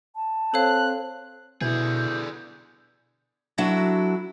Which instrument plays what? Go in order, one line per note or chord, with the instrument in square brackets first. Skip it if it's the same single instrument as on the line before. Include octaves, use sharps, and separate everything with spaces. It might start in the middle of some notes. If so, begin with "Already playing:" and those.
[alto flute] A5
[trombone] C4 [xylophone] A4 C#5 F5 [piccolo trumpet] F#6
[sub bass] B2 [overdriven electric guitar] D3 G#4 [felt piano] B3 E4 [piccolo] G6
[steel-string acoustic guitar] F#3 D4 E4 F#4 A4